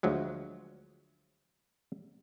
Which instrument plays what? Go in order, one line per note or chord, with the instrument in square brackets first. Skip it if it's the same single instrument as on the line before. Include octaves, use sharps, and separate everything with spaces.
[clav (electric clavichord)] D2 F3 F#3 G#3